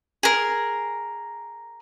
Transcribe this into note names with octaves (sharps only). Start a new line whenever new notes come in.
G#4 A#4